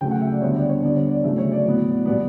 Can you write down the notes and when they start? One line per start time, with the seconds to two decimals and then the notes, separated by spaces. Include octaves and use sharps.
0.01 C#3 F#3 A3 G5
0.11 F#5
0.21 E5
0.32 D5
0.41 D3 G3 B3 C#5
0.56 D5
0.69 C#5
0.82 D3 G3 B3 D5
0.96 C#5
1.10 D5
1.24 C#3 F#3 A3 E5
1.38 C#5
1.52 D5
1.65 A2 F#3 B3
2.06 B2 G3 B3 D5